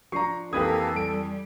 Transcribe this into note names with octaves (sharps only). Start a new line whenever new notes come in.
F3 D4 A#5 C#6 C7
F2 E3 A#3 G4 A4 B4 D#6 G#6
G3 D7